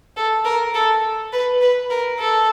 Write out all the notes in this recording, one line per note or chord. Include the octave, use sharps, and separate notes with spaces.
A4
A#4
A4
B4
B4
A#4
A4